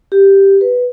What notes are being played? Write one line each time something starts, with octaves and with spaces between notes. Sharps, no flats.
G4
B4